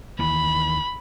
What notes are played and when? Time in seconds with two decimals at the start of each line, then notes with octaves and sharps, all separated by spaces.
0.19 D#2 E3 B5